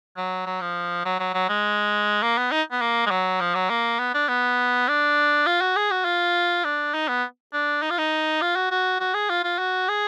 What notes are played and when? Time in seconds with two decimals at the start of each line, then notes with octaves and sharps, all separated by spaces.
0.17 F#3
0.46 F#3
0.61 F3
1.05 F#3
1.20 F#3
1.34 F#3
1.49 G#3
2.22 A#3
2.38 B3
2.52 D#4
2.72 B3
2.81 A#3
3.06 G#3
3.11 F#3
3.40 F3
3.55 F#3
3.70 A#3
4.00 B3
4.14 D4
4.28 B3
4.88 D4
5.46 F4
5.61 F#4
5.76 G#4
5.91 F#4
6.05 F4
6.64 D4
6.94 D#4
7.08 B3
7.53 D4
7.82 D#4
7.90 F4
7.98 D#4
8.42 F4
8.56 F#4
8.71 F#4
9.00 F#4
9.14 G#4
9.30 F4
9.44 F4
9.59 F#4
9.89 G#4